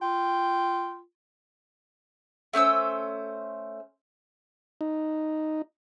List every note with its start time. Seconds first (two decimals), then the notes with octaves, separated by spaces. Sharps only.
0.02 F4 G5
2.53 A3 C#4 C5 E6
4.81 D#4